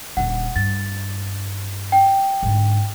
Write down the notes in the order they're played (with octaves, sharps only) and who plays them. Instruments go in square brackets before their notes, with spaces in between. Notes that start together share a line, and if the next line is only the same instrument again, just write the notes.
[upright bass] D#1 D3 [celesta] F#5
[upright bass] G2 [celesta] A6
[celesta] G5
[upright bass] G#2 D3